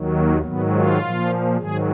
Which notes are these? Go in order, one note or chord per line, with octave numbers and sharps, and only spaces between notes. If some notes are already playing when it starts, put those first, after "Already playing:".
Already playing: D#2 D#3 F#3
A#3
G#2 D#3 F#3 B3
F4
A#2 F3
G#2 D#3 F#3 G#4